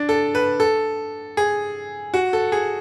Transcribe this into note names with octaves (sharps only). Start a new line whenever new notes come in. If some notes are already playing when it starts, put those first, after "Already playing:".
Already playing: D4
A4
B4
A4
G#4
F#4
A4
G#4